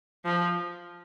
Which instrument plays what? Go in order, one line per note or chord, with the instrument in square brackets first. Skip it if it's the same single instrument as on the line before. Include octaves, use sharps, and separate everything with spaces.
[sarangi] F3